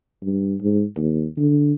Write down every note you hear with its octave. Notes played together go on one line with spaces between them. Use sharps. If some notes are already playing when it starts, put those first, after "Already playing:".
G2
G#2
D#2
D3